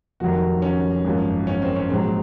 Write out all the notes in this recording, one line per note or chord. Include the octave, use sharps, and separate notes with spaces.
F1 F2 D#3 F#3 F#4
C#4
G#1 F#2 F3
C#4
C4
C#4
A#1 G#2 F#3 C4